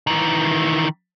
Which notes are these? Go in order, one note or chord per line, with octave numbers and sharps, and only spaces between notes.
D#3 E3